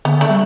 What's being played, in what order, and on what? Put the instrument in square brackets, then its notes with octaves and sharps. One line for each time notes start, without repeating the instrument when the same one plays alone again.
[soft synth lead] D3 [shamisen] B3
[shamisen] A3 D4
[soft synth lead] G3